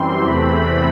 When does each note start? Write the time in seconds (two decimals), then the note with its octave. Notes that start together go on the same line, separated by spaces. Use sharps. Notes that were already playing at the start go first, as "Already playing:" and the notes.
Already playing: F#2 E3 G3 C4 C6
0.25 E2 C3 E3 A3 C4 B5